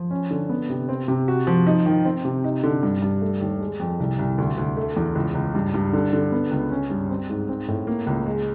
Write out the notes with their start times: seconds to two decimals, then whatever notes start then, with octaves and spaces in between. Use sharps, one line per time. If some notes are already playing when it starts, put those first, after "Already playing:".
Already playing: F3
0.11 C#4
0.31 D3
0.49 B3
0.70 C3
0.89 C4
1.08 C3
1.28 F#4
1.47 F3
1.67 D#4
1.86 D#3
2.05 C4
2.25 C3
2.44 D#4
2.63 D3
2.83 G2
3.02 G2
3.22 A3
3.41 D#2
3.60 G#3
3.80 F2
4.00 C2
4.19 C2
4.38 D2
4.58 D2
4.77 A3
4.96 E2
5.15 C#2
5.35 C#2
5.55 G2
5.74 G2
5.93 D3
6.13 D3
6.32 B3
6.51 C#2
6.71 C#4
6.90 G2
7.10 C4
7.30 G#2
7.49 C4
7.68 A2
7.87 A#3
8.07 C#2
8.26 G#3